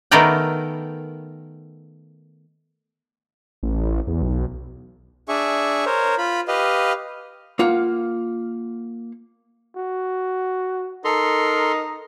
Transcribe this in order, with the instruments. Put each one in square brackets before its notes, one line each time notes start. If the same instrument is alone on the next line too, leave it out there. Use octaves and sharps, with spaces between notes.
[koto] D#3 A3 B3 A#4 D5 G5
[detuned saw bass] A1
E2
B1
[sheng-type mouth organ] D4 G#4 E5 C#6
A#4 C5 C#5
F4 B5
G4 B4 D#5 F5
[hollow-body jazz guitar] A#3 F4 F5 F#5
[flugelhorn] F#4
[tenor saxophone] D#4 [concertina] A4 C6 [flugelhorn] A#4